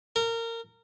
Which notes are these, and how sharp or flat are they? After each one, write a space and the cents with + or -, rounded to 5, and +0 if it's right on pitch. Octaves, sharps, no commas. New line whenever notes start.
A#4 -25